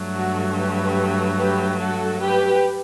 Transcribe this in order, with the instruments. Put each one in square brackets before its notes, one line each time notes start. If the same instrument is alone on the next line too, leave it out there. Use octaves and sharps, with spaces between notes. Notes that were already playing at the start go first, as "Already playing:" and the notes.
Already playing: [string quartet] G2 F#3 A3
[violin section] F#4 A4
G4 B4
G4 B4
F#4 A4
G4 B4